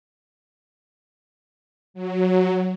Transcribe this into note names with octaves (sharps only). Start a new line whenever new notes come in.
F#3